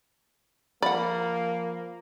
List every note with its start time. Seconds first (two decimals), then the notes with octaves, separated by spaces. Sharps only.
0.82 F3 A#3 D5 F#5 B5